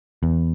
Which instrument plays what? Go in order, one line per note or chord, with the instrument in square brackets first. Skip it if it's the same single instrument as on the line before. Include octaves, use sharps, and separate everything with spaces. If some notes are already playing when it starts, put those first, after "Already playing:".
[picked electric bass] E2